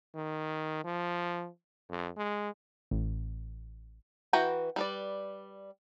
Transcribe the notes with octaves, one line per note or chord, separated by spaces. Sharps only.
D#3
F3
F2
G#3
A1
E3 F#4 B4 G5 A#5
G3 B4 D5